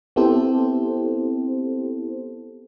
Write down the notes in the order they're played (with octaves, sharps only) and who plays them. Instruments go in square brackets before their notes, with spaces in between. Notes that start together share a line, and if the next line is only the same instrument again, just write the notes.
[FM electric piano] B3 C4 E4 G4 A4 C5